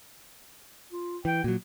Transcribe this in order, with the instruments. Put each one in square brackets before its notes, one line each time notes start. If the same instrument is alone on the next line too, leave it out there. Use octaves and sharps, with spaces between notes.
[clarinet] F4
[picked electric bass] E3 [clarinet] G5
[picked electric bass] A#2 F#3 [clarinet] F#4